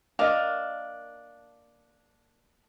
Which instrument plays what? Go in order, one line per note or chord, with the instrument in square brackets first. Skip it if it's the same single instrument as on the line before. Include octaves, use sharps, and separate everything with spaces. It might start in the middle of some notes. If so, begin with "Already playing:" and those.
[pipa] A#3 D4 F5 [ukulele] A#4 D#5